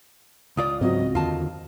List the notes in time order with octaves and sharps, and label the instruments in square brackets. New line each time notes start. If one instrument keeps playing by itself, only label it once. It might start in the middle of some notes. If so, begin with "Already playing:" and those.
[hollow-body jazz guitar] C#2 F4 D5 [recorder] D#6
[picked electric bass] G#2 F#3 [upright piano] C4 F#4 [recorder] D#5
[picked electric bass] E2 D3 D#3 [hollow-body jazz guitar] F4 A5